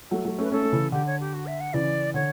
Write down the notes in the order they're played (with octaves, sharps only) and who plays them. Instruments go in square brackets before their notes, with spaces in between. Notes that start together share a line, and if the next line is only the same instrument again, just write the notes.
[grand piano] F#3 A3
F#3 A3
[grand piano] A3 C#4 [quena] B4
[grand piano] A3 C#4 [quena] A4
[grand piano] A3 C#4
C#3 E3
[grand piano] D3 [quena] G4
[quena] C#5
G4
F#4
E5
F#5
[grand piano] C#3 E3 [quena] D5
[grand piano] D3 [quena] C#5